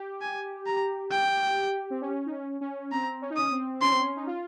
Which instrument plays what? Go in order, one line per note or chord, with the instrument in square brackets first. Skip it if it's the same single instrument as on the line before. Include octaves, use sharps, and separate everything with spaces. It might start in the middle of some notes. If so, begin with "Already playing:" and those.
Already playing: [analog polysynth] G4
[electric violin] G#5
A#5
G5
[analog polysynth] C4
C#4
D#4
C#4
C#4
[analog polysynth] C4 [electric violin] A#5
[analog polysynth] C#4
D#4
[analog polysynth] C#4 [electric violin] D#6
[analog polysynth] C4
[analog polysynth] C#4 [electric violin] C6
[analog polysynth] C4
C#4
D#4
F4